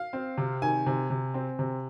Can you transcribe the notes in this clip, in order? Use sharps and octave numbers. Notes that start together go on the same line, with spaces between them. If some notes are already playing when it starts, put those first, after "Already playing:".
Already playing: F5
C4
C3
D#3 G#5
C3
C3
C4
C3